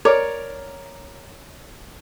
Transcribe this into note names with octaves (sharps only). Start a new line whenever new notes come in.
A#4 C#5 D5 D6